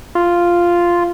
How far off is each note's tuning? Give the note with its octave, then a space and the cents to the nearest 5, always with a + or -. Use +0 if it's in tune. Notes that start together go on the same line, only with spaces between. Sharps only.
F4 -5